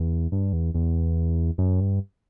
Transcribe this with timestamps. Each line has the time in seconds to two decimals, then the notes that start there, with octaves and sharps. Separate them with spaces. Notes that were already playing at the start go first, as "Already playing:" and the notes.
Already playing: E2
0.32 G2
0.53 E2
0.74 E2
1.58 F#2
1.80 G2